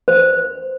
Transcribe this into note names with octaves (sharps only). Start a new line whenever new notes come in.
C5